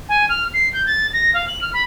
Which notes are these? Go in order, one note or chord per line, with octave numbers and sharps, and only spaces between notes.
G#5
F6
C7
G6
A6
A#6
F5
F#7
F6
B5